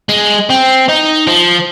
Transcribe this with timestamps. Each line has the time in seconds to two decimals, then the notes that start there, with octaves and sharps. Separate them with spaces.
0.09 G#3
0.50 C4
0.89 D#4
1.27 F3